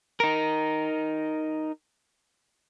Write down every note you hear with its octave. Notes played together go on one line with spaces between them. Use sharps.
D#4 A#4